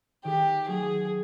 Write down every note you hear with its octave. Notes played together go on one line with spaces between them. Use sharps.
D#3 G4
F#3 A3 G#4